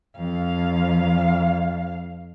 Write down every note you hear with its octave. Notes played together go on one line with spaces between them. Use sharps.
F2 F5